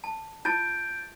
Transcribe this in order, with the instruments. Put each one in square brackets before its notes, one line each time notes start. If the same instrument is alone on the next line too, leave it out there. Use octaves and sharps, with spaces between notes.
[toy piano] A5
[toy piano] F4 A5 [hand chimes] G6 A6 D7